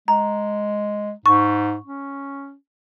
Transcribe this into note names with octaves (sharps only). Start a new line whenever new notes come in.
G#3 A#5
G#2 C#6
C#4